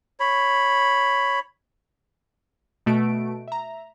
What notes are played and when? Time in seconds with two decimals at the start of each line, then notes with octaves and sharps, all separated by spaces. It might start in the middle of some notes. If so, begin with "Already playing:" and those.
0.20 C#5 B5
2.86 B2 A3 F#4 D7
3.48 E5 A#5